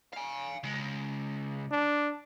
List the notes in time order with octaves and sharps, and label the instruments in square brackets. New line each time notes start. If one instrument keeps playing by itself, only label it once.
[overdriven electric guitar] F5 G#5
C#3 G#3
[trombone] D4